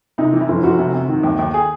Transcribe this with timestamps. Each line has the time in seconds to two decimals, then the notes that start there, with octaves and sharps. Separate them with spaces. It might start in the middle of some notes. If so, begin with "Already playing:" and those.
0.18 C3 D#4
0.33 E3
0.41 E4
0.49 F1
0.64 F1 F#4
0.78 C3
0.93 C3
1.08 D#3
1.23 D#2
1.39 D#2
1.54 G#4